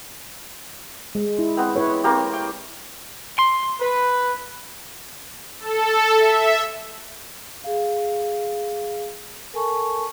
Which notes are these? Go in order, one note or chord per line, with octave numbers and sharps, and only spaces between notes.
G#3
E4
B3 C4
E4 B4 C#5
A#3 C4 G4
G5
C6
B4
A4
E5
G#4 F5
A4 A#4 G#5 A5 C#6